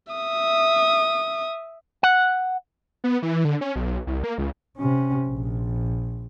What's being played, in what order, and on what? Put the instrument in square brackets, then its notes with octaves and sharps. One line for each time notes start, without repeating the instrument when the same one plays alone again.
[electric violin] E5 D#6
[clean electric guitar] F#5
[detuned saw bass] B3
E3
D3
C#4
B1
C2
A#3
C#2
[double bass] C3 C#4
A#1